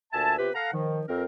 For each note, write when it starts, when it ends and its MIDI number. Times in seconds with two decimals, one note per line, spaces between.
0.13 0.34 38
0.13 0.34 46
0.13 0.34 76
0.13 0.34 80
0.13 0.34 81
0.38 0.50 48
0.38 0.50 59
0.38 0.50 65
0.38 0.50 67
0.38 0.50 71
0.55 0.70 69
0.55 0.70 77
0.55 0.70 78
0.55 0.70 82
0.73 1.01 51
0.73 1.01 53
1.08 1.25 41
1.08 1.25 60
1.08 1.25 70